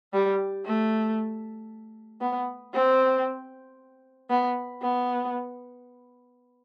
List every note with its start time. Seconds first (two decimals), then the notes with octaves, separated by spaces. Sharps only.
0.13 G3
0.65 A3
2.21 B3
2.74 C4
4.30 B3
4.82 B3